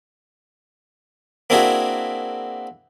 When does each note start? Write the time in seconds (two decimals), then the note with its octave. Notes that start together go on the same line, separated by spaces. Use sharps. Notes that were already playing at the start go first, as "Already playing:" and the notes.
1.50 A#3 C4 D4 E4 F#4 G#4